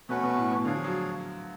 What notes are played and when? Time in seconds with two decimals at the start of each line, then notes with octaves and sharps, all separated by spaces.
0.09 B2 A3 C#4 F#4 B4
0.23 B2
0.37 A2
0.52 B2
0.65 D3 D4 G#4 C#5 F5
0.74 F3
0.84 F#3